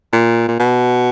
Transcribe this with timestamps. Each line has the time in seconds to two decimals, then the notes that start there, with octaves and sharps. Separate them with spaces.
0.13 A#2
0.48 A#2
0.60 B2